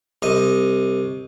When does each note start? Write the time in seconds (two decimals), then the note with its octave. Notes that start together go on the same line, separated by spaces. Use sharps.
0.22 C2 D#5